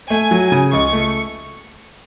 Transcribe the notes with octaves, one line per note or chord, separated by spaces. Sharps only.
A3 G#5
F#3
C#3
C#2 C#6
A3